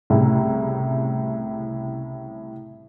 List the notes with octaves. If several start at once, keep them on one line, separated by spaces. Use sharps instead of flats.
C2 A2 C#3